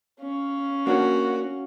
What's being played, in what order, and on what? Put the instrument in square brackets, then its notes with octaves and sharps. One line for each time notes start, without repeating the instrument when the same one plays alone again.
[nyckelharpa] C#4 F5
[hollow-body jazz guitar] A#3 D4 C#5 [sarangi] F#4